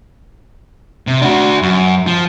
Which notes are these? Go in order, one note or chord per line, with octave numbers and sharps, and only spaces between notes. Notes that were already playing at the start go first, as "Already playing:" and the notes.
C3
D4 F#4
F#2
F3